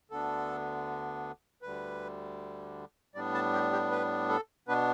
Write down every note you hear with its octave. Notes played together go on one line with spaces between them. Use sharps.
D2 D3 B3 D4 A4
D2 D3 G3 B4
A2 G3 B3 D4 D5
A5
G4
G4
B4
A4
B2 B3 D4 B4